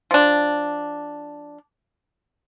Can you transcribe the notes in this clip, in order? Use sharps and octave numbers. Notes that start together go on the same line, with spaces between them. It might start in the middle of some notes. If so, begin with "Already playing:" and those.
F3 D4